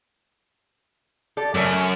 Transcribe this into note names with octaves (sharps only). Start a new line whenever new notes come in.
G4 A4 D5
F#2 C#3 A3 C#4